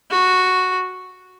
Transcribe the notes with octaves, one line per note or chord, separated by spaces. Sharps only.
F#4